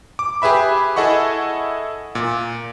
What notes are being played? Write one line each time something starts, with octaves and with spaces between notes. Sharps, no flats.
D6
G4 G#4 B4 E5 B5
E4 G#4 A4 D#5 F#5 C#6
A#2